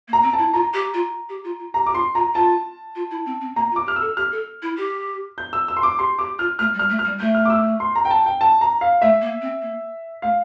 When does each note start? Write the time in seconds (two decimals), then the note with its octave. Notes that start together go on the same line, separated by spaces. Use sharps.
0.08 A#3
0.13 A#5
0.23 C4
0.33 A5
0.39 E4
0.53 F4 A#5
0.74 G4
0.94 F4
1.29 G4
1.44 F4
1.59 F4
1.74 G4 A#5
1.87 G4 D6
1.95 F4 C6
2.15 F4 A#5
2.35 F4 A5
2.96 F4
3.11 E4
3.26 C4
3.41 C4
3.56 A#3 A#5
3.71 F4
3.76 D6
3.86 G4 F6
3.96 E6
4.01 A4
4.17 G4 F6
4.32 A4
4.62 E4
4.77 G4
5.38 G6
5.53 E6
5.68 E6
5.77 C6
5.83 D6
5.99 G4 C6
6.19 G4 D6
6.39 F4 F6
6.59 A3 F6
6.74 G3
6.79 F6
6.90 A3
6.99 F6
7.05 G3
7.20 A3 G6
7.35 F6
7.45 D6
7.50 E6
7.80 C6
7.95 A#5
8.05 G5
8.11 A5
8.26 G5
8.41 A5
8.61 A#5
8.81 F5
9.02 A3 E5
9.22 A#3
9.42 C4
9.62 A#3
10.22 A3 F5